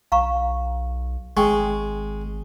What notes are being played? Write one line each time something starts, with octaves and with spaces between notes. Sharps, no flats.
B1 F5 A#5 C#6
G#1 G#3 G5 C#6